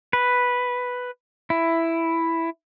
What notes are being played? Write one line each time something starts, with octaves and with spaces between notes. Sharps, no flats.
B4
E4